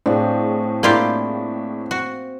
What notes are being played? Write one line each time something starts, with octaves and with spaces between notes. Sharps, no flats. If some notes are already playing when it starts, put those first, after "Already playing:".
A2 C4 D4 G#4 F5
A#3 D4 E4 F4 G4
F#4